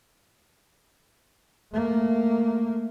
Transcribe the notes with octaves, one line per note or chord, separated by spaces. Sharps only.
A3 A#3